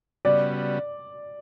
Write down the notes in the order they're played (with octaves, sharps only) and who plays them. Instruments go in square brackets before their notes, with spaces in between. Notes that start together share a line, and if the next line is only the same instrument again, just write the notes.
[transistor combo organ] C#3 G3 B3 F#4 [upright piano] D5